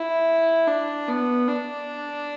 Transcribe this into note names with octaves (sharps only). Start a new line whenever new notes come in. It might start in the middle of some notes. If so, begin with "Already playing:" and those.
Already playing: E4
D4
B3
D4